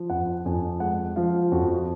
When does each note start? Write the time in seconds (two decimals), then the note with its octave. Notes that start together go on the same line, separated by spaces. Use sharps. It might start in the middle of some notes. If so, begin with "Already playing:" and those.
Already playing: F3
0.10 F2 F#5
0.45 F2 G#5
0.80 G#3 F#5
1.16 F3 F5
1.52 F2 F#4